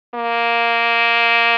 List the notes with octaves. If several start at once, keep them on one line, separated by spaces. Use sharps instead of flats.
A#3